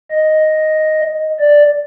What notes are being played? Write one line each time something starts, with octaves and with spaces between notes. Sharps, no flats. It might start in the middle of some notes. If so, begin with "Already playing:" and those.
D#5
D5